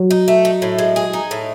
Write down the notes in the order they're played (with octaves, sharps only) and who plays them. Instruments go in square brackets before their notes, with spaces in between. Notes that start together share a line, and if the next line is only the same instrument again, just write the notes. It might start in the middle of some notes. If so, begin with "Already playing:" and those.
Already playing: [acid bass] F#3
[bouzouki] D#4
A3
D#4
A2
G#3
G#4
D#4
A2